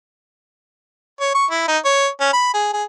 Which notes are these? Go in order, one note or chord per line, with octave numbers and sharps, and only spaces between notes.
C#5
C#6
E4
D#4
C#5
C#4
B5
G#4
G#4